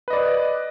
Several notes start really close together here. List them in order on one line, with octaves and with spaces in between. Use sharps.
B4 D#5 D5